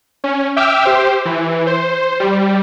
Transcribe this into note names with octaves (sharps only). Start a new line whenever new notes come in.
C#4
E5 G5 D6 E6 F6
G4 C5
E3
C5
G3